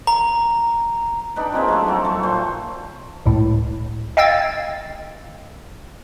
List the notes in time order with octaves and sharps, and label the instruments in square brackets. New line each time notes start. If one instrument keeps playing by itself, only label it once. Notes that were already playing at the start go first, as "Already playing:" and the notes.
[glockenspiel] A#5
[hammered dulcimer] D4 D#4 B4 G5
G#3 A#3 C4 F4
F#3 A3 A4
F3 F#3
A3 G#5 C#6
A#2 C5 A5
[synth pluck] C#2 A2
D#5 F5 G5 E6 G#6 A6